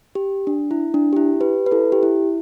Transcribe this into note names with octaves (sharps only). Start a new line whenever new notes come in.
G4
D4
E4
D4
G4
E4
G4 B4
B4
E4 A4
G4
E4